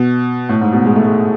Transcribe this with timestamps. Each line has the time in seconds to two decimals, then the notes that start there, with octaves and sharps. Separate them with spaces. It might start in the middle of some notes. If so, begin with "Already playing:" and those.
Already playing: B2
0.49 A2
0.61 G#2
0.73 B2
0.85 G#3
0.95 A3
1.05 G#3